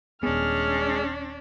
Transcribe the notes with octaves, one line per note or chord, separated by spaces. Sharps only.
D#1 G#3 B3 C#4 D4 G#4 F6